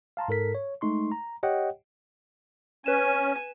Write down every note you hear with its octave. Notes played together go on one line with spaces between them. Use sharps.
F5 A5 A#5 C6
G#2 A4 A#4 B6
C#5
G#3 A3 D#4 C6 C#6
A#5
G4 C#5 D#5 F#5 G5
C#4 B4 G#5 E7